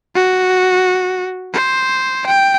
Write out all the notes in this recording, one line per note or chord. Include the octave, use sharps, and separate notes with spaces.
F#4
C5
G5